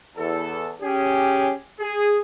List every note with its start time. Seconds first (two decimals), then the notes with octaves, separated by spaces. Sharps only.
0.17 E2 A4
0.82 C#4 G4 G#4
1.80 G#4